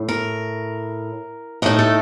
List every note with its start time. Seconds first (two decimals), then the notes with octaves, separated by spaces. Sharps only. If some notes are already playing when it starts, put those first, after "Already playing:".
Already playing: A2
0.09 A#4
1.62 A2 A3 D#4 A#4
1.79 A4